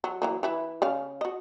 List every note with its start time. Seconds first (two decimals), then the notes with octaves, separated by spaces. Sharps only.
0.04 F#3
0.22 E3 F#3 A#3
0.43 E3 E4 B4
0.82 C#3 C#4 F5
1.21 F#4 D#5